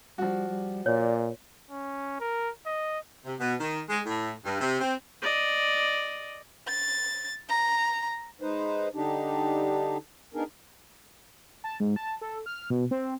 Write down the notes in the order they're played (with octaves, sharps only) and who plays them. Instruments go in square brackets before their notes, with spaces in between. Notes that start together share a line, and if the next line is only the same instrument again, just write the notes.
[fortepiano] F3 F#4 [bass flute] G3
[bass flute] G3
[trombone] A#2 [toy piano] C#5 [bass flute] D5
[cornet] C#4
A#4
D#5
[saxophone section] C3
B2
D#3
G#3
A2
G2
C3
C4
[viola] D5 D#5
[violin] A6
A#5
[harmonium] G#3 D#4 B4 C5
D3 G3 D4 D#4 G4
B3 D4 D#4 G#4 A#4
[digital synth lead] A5
G#2
A5
A4
F6
B2
C4